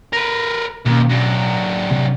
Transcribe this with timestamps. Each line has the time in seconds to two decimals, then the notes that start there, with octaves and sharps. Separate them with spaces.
0.13 A#4 B4
0.86 D#2 B2 C4 C#4
1.10 F#3 D4
1.91 C3 C4